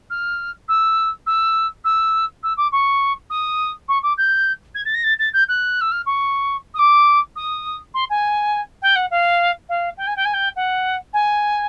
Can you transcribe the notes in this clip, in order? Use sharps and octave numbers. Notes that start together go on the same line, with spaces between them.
F6
E6
E6
E6
E6
D6
C#6
D#6
C#6
D6
G6
G#6
A6
A#6
A6
A6
G6
F#6
E6
F6
C#6
D#6
D6
D#6
C6
G#5
G5
F#5
F5
F5
G5
G#5
G5
G#5
G5
F#5
G#5